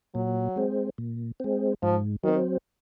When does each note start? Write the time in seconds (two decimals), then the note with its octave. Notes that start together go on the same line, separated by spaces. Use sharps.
0.15 A#2 F#3
0.56 G#3 C4
0.98 A#2
1.40 G#3 C4
1.82 G#2 F3
2.24 D#3 F#3 C4